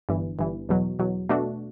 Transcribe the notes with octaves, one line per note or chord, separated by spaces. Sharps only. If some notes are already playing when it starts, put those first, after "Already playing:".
G1 G2 E3
G1 G2 E3
E2 B2 F#3
E2 B2 F#3
B2 A3 D4 F#4